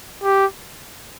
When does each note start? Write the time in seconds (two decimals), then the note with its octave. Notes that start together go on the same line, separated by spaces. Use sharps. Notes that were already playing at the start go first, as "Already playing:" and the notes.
0.23 G4